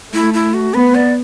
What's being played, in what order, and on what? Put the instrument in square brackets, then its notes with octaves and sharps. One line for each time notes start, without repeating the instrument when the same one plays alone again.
[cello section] A3 [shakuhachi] E4
[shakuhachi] E4
F#4
[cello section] B3 [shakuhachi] B4
[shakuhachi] D5